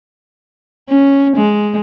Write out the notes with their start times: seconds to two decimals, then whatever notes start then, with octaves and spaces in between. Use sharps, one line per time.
0.89 C#4
1.37 G#3